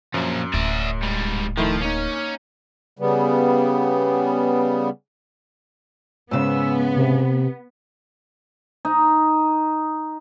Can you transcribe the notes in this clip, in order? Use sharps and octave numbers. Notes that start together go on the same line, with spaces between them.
F#2 F3 A#3
D1 D5 E5
G#2 G3
D#3 F3 A3 E4
A#3 C#4 D#4
C#3 G3 B3
G#2 C#3 B3 E6
C3
D#4